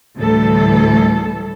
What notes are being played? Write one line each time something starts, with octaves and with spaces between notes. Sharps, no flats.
D2 A2 E3 G3 A4